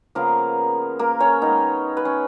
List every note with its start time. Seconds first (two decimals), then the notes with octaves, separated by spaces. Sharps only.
0.15 C#3 F3 A#3 B3 A#4
0.99 A#3 A#4
1.20 C#4 C#5
1.41 D#3 G#3 B3 D#4 D#5
1.97 B4
2.05 C#4 C#5